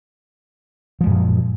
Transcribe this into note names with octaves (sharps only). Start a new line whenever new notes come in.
F#2 A#2 F3 G#3